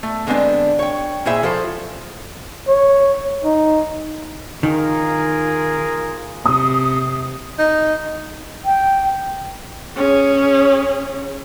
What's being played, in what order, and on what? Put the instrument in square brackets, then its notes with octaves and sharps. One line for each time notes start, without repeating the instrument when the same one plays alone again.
[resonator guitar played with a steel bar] A3
D3 G#3 B3 C4 D4
C#5 G5
A#2 E4 G#4 C5 E5
F3 A4 C5
[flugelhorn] C#5
D#4
[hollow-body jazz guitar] D#3 [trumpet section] F4 G#4 A#4
[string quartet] C3 [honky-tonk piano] D#6
[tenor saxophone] D#4
[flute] G5
[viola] C#4 G#4